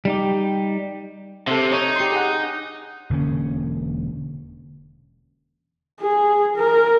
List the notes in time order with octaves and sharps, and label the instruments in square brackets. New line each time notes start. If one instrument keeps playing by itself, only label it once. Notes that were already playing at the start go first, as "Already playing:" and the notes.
[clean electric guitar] G3 D#4 G4
[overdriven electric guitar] C3 [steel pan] A4 E5
[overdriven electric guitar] D#4 [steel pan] C#5
[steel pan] G4 C6
G#4 F#5
[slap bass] E1 D3 A#3 C#4
[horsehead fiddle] G#4
A#4